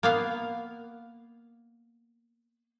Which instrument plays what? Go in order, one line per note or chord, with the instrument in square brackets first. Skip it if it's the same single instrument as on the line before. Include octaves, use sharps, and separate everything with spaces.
[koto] A#3 B3 F5